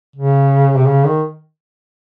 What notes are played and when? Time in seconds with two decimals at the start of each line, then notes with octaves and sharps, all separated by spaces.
0.16 C#3
0.76 C3
0.88 C#3
1.06 D#3